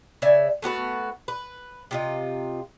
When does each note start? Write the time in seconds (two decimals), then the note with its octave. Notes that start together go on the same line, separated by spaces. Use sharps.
0.22 C#3 D5 E5 G#5
0.62 A3 B3 F#4 B4
1.28 B4
1.91 C3 F4 D#5